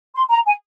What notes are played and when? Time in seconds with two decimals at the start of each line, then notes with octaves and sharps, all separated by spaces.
0.14 C6
0.30 A#5
0.45 G#5